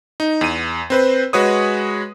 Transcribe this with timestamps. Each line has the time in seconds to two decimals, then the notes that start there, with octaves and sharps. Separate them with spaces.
0.20 D#4
0.41 E2 D#7
0.90 C4 B4 C5
1.33 G#3 F#4 B4 C#5 D#6